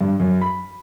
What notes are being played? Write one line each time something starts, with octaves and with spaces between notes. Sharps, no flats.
G2
F#2
B5